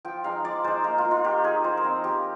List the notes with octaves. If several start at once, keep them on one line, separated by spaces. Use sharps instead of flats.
F3 G5
G#3 D#4 F5
F3 D5
G#3 D#4 C5
A#3 A#4
F4
D#4
F4
A#3 G4
D#4 G#4
F3 C5
A#4
C4 D#4
F3 G4